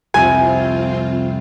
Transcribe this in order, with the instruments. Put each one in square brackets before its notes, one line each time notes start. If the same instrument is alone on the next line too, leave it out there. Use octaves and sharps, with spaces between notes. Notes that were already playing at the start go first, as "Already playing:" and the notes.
[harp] C2 F2 E7 [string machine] C4 F4 [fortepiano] G#5